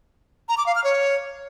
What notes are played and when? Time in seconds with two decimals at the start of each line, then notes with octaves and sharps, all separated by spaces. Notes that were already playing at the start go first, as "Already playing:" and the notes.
0.49 A#5
0.58 D6
0.66 F5
0.75 F6
0.84 C#5